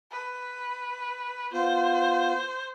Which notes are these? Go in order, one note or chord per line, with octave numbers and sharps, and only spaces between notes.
B4
B3 F4 C5